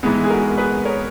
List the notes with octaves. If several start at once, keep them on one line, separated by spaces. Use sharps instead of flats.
G#2 E3 G#3 B3 G#4
G#4
F#4 A#4
G#4 B4
A#4 C#5